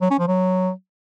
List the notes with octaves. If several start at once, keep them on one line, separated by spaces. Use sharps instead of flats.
F#3
C#4
F3
F#3